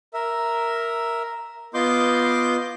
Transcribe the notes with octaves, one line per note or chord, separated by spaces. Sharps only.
A#4 E5
B3 F4 D#5 C6 D6 G6